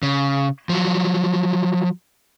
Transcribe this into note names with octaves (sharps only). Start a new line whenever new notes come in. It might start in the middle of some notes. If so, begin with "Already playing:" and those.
C#3
F3 F#3